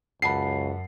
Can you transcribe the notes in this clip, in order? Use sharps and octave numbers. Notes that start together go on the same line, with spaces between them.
C#2 F#2 F#5 A5 B5 C7